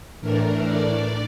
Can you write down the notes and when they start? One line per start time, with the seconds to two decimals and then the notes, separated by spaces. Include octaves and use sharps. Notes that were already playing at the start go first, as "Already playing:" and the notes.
0.21 A2 E3 A3 D4 A#4
0.67 D5